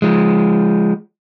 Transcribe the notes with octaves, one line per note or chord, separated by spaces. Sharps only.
F3 G#3